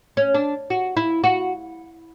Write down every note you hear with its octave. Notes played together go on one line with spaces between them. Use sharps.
C#4
D4
F#4
E4
F#4